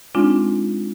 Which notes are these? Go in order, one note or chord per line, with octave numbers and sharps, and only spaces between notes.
G#3 C4 D4 D#4 F4